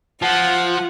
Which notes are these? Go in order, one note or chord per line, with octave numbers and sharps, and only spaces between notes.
F3 F4 F#5